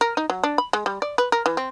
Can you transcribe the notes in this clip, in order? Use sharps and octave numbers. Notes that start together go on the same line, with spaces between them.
A#4
D#4
F#3
D4
B5
G#3
G3
D5
B4
A#4
E3
C4